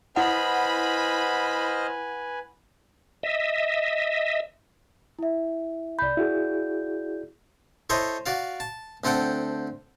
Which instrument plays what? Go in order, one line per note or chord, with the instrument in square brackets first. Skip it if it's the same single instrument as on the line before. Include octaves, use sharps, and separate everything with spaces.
[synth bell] E4 F#5 [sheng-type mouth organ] B4 G#5 [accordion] C5 D#5 F6 [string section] B5
[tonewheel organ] D#5 E5
[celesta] E4 E5
[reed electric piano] C2 B5 [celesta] D5 G6
[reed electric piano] E4 F#4 G#4
[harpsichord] E4 A4 C5 C#5 D#5
F#4 D5 F5
A5
D2 C4 A4 F#5 G5